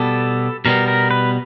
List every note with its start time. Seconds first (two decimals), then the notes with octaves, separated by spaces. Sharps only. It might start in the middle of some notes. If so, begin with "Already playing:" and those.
Already playing: B2 G3 B3 A4
0.65 B2 G3 B3 A#4
0.88 A#4
1.11 B4